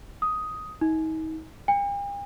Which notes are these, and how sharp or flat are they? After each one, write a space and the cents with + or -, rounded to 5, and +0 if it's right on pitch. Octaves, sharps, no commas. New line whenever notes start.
D#6 +5
D#4 +35
G5 +45